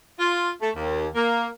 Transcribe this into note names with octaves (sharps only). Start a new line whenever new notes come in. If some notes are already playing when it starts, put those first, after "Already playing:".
F4
A3
D#2
A#3